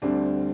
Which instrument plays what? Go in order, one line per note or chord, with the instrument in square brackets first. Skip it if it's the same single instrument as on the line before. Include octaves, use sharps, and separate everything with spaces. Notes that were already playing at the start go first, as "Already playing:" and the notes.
[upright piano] D2 D3 G3 C4 D4